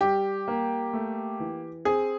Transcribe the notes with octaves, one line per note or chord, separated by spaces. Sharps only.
G3 G4
A#3
A3
E3
C4 G#4